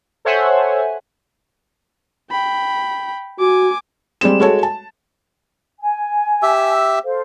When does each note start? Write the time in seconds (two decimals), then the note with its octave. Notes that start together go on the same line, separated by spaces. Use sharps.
0.25 A4 C5 C#5 E5 F#5 G#5
2.31 G5 B5
3.40 F#4 G#5 D6
4.21 G3 G#3 C4 E7
4.40 G#3 F#4 A4 C#5
4.63 A5
5.80 G#5
6.43 G4 E5 E6
7.05 A4 C5 F5